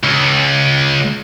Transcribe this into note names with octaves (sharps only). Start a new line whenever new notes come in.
C#2